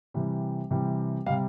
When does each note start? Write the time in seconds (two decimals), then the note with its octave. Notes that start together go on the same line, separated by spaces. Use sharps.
0.14 C3 E3 G3
0.71 C3 E3 G3
1.26 C3 G3 F5